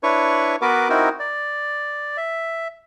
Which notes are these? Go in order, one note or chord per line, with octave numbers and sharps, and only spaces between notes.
D4 E4 B4 C#5 C#6
B3 F#4 A#4 B4 D6
C4 D#4 E4 F#4 A#4
D5
E5